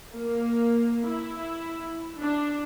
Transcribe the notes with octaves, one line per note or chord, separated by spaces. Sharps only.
A#3
E4
D4